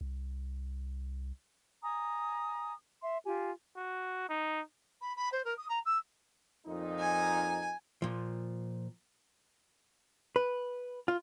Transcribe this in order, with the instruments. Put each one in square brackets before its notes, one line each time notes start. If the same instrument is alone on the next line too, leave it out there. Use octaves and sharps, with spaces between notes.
[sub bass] C2
[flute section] G#5 A#5 D#6
E5 C6
F4 G4 G#5
[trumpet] F#4
D#4
[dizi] B5
B5
C5
A#4
D#6
A#5
E6
[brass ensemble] F2 A#2 D#4
[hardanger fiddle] G#5
[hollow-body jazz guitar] A#2 F3
B4
F4